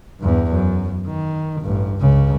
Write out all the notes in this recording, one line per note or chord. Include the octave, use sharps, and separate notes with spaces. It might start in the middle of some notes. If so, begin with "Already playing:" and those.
E2 G2
F#2
D#3
A1 G2
C#2 C#3